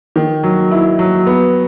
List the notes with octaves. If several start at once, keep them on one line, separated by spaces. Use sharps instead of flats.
D#3
F#3
E4
F#3
B3